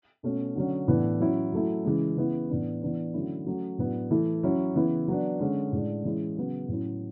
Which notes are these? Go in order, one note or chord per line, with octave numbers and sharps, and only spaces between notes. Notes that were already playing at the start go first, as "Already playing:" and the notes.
B2 A3 C#4
D3 F#3 C#4
A2 E3 B3 D4
F#3 C#4 E4
F#3 A3 E4
C#3 E3 G#3
C#3 E3 B3 E4
A2 E3 B3 D4
E3 B3 D4
D3 F#3 A3 C#4 E4
F#3 A3 C#4
A2 F#3 B3 D4
E3 A3 E4
F#3 C#4 E4
C#3 E3 B3 E4
F#3 B3 D4
D3 G#3 C#4
A2 G#3 D4
E3 G#3 C#4 E4
C#3 F#3 B3
A2 F#3 C#4 E4